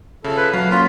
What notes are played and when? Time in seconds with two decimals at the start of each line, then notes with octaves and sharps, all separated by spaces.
0.24 C#3 F3 E4 A4
0.37 B4
0.53 A#2 F#3 F5
0.71 A#3 C#4 F4 F#4 B6